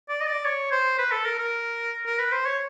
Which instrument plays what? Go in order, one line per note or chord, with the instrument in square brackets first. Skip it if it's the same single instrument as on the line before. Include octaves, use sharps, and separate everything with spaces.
[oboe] D5
D#5
D5
C#5
C5
B4
A4
A#4
A#4
A#4
B4
C5
C#5